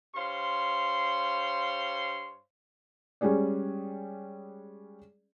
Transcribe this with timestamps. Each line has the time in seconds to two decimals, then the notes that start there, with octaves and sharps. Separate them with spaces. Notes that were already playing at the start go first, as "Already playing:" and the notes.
0.15 G2 C5 C#5 F5 C6
3.21 G3 G#3 C#4 G#4 D5